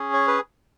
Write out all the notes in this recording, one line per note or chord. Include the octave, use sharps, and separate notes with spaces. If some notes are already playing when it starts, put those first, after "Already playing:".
Already playing: C#4 G#4
C#5
B4